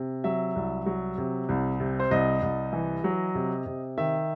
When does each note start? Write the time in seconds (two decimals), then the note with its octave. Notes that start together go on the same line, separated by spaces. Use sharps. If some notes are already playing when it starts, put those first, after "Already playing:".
Already playing: C3
0.24 F#3 E5
0.56 C2
0.86 F#3
1.18 C3
1.49 C2
1.80 C3
2.00 C5
2.11 C2 D#5
2.42 C2
2.73 E3
3.04 F#3
3.35 C3
3.66 C3
3.97 D#3 E5